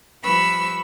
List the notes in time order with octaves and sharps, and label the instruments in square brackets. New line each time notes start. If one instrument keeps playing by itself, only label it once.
[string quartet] F3 G3 B4 B5 C#6 E6